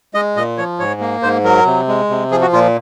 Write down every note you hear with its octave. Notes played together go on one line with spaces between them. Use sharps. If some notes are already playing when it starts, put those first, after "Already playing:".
G#3 D#5
A#2 D#5
F3 C#5
G#2 C#5
A#3
G#2 C5
F#3 A#4
C3
G#3
C3
F3 G#4
F#4
A#2 F4